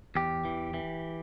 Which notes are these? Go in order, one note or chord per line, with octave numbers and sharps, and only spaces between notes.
E2 G4
E3
E3